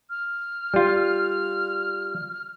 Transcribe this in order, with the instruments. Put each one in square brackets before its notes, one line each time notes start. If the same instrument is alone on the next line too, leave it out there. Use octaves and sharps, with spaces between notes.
[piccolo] F6
[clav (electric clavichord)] G3 F4